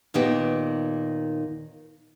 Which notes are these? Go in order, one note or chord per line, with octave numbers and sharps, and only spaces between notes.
D#2 A#2 D#3 B3 D#4 G4